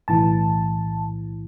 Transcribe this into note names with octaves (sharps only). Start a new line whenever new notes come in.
B1 A2 E3 A5